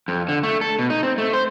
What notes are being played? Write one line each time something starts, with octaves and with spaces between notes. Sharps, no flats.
F2
D3
A3
A4
B2
D#4
C4
A3
C5